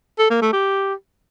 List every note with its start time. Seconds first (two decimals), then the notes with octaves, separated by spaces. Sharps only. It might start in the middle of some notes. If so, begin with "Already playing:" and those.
0.19 A4
0.30 A#3
0.42 A3
0.53 G4